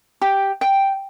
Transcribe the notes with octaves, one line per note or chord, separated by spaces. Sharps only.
G4
G5